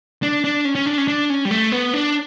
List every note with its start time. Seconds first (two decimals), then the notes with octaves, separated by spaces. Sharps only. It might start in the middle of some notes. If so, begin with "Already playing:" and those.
0.22 D4
0.44 D4
0.65 C#4
0.75 C#4
0.86 D4
0.98 C#4
1.08 D4
1.30 C#4
1.45 G3
1.51 A3
1.72 B3
1.93 D4